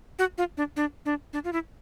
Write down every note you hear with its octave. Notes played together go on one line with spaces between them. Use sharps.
F#4
F4
D4
D4
D4
D4
F4
E4